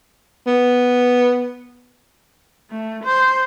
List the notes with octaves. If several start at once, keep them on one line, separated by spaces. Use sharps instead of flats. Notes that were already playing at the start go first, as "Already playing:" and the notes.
B3
A3
C5